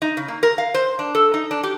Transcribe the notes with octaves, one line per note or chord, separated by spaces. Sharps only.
D#4
C#3
A#3
A#4
F5
C5
D4
A4
D#4
D4
G4